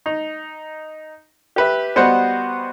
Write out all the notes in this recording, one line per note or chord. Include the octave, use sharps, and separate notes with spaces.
D#4
G4 B4 E5
G3 B3 F#4 C5 D#5 F#5